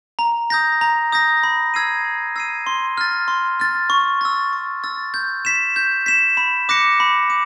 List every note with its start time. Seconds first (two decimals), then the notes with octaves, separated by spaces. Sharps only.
0.19 A#5
0.50 D#6 G6 A#6
0.81 A#5
1.12 D#6 G6 A#6
1.43 B5
1.74 E6 G#6 C7 D#7
2.04 B5
2.36 E6 G#6 C7 D#7
2.67 C6
2.98 F6 A6
3.28 C6
3.60 F6 A6
3.90 C#6
4.21 E6 A6
4.53 C#6
4.84 E6 A6
5.14 G6
5.45 B6 E7
5.76 G6
6.06 B6 E7
6.37 B5
6.69 D6 F#6 A#6 C#7
7.00 B5
7.30 D6